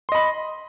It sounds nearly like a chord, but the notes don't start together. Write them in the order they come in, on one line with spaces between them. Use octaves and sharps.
C6 D#5 B5